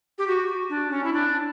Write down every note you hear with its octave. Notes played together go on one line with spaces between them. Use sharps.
G4
F#4
D4
C#4
E4
D4